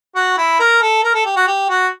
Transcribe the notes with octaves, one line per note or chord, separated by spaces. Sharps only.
F#4
E4
A#4
A4
A#4
A4
G4
F#4
G4
F#4